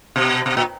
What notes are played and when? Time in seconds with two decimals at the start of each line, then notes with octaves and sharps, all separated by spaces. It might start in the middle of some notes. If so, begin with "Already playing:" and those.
0.16 B2
0.46 B2
0.57 A#2